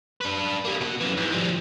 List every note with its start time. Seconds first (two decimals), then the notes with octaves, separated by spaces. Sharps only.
0.21 D4 B4
0.65 G3 A#3
0.81 B2 F#5
1.00 F#2 E3
1.17 G#2 E3
1.32 F3 G3